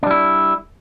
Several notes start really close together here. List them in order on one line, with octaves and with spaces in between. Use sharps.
D4 G3 E4